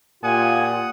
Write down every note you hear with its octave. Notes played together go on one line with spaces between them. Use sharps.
A#2 F4 G4 F#5 G#5 D#6